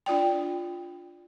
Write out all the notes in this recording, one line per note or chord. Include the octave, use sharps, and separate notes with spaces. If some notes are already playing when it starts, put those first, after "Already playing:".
D4 F4 D5 G5